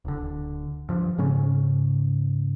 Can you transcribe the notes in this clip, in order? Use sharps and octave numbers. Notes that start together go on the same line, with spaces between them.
D1 D3
G2 F3
G#2 C#3 C#4